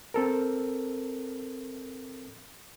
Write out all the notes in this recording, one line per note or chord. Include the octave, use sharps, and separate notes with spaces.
C4 A4 A#4